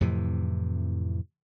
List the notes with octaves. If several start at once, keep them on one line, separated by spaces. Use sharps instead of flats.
F2 A2 C3 E3